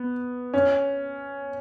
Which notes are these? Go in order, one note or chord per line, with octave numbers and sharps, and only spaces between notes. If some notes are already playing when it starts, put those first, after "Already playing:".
Already playing: B3
C#4